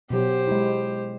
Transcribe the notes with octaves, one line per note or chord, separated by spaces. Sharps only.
B2 F#3 G4 C5
G#3 E4